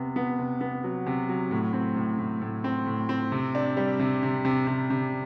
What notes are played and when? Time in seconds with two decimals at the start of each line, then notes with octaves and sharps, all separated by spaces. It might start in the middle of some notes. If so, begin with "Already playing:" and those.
Already playing: C3 B3
0.16 B3
0.39 C3
0.61 B3
0.84 F#3
1.06 C3
1.29 F#3
1.51 A2
1.73 C4
1.96 A2
2.19 A2
2.41 A2
2.64 C4
2.86 A2
3.09 C4
3.32 C3
3.55 D4
3.77 G3
3.99 C3
4.23 C3
4.45 C3
4.67 C3
4.90 C3